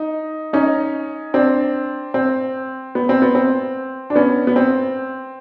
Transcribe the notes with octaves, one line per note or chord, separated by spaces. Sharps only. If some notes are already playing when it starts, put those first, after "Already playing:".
Already playing: D#4
C#4 D#4
C4 D4
C4
B3
C4
B3
C4
D4
B3 C#4
B3
C4